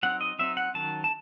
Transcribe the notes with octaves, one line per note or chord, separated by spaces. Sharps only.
F#3 C4 D#4 F#5
D#5
F#3 C4 D#4 E5
F#5
D#3 F#3 C#4 A5
A5